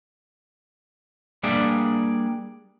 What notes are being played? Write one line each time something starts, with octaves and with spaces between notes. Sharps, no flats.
G3 A#3 D4 G#4 D5